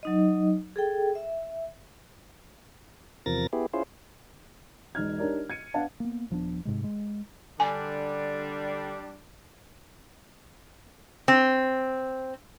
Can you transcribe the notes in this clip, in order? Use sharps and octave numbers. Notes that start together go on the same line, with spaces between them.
F#3 D#4 D#5
G#4 A4 G5
E5
E2 C3 F3 A#4 A6 A#6
B3 E4 G4 G#4
C#4 E4 F4 G#4 C5
E1 D#4 F6 G#6
D4 D#4 G4 A#4 C#5 D5
G#6 C#7 D#7
B3 D4 F5 F#5 A5
A#3 B3
D#1 F3 B3 D4
G#2 C3 G#3
G#3
D3 G3 D4 G#5
C4